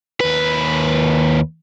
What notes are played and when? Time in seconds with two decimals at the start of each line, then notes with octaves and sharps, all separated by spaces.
0.21 D#2 B4